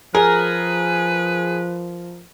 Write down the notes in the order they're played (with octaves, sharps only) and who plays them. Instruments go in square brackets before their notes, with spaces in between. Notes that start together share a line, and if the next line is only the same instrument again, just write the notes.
[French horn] F3 [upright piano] G#4 [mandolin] A#4 [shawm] B4